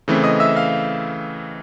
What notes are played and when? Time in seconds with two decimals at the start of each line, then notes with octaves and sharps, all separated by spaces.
0.08 C#3 E3 A3 C4
0.24 D#5 D#6
0.40 E5 E6
0.56 F5 F6